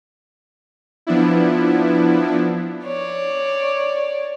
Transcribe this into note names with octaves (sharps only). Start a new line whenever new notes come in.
F3 B3 D4 E4
C#5 D5